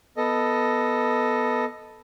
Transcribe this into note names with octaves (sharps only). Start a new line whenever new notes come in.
B3 A4 D#5